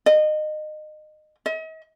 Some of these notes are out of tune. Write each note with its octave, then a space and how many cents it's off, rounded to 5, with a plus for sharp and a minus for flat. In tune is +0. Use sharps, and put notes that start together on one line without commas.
D#5 -25
D#5 +45